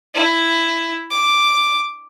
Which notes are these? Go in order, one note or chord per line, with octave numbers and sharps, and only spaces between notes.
E4
D6